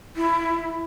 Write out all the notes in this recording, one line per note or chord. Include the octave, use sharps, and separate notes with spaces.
E4